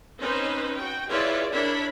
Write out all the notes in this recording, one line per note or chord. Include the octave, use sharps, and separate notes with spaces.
C4 C#4 D#4 B4 C5
F#4 G5
E4 F4 G#4 B4 C#5 D5
D4 E4 A#4 C#5 B5